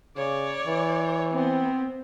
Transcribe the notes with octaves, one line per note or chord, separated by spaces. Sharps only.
C#3 C#5 D5
E3
B3 C4